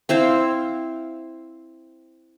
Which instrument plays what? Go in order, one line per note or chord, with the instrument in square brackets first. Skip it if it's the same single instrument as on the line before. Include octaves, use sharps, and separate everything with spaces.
[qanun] C4 E4 C5 F5